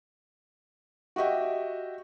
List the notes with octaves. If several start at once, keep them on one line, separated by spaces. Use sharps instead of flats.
F#4 G4 D#5 E5 G5